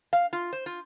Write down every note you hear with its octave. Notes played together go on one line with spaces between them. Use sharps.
F5
F4
C5
F4